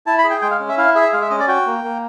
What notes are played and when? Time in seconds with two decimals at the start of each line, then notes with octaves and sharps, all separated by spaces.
0.06 E4 A5
0.18 B5
0.24 G#4
0.30 G5
0.41 G#3 G5
0.51 F5
0.60 C#4
0.69 E5
0.77 E4 F5
0.95 G#4 E5
1.13 G#3 F5
1.21 E5
1.30 C#4 D#5
1.40 D5
1.48 F#4 G5
1.67 A#3
1.84 A#3